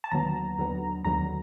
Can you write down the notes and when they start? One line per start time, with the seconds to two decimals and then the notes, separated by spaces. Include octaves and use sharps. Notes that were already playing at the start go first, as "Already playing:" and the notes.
0.04 A5
0.11 D#2 D3 F#3 B3 A#5
0.58 D#2 D3 F#3 B3
1.05 D#2 D3 F#3 B3 A#5